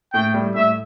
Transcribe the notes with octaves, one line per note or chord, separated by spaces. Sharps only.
A2 G5
G3
A2 E5